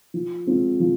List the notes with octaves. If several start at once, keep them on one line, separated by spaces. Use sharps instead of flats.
F3
G#3 C4 F4
F3